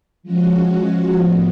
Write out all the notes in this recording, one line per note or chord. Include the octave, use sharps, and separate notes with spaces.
F3 G#3 C#4 F#4
A2 F3 B3